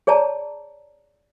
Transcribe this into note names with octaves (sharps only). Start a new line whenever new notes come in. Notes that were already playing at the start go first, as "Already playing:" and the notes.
G#4 C#5 D5 A5 A#5